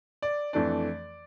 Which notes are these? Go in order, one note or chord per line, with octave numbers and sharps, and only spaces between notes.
D5
F2 E3 A3 D4 D5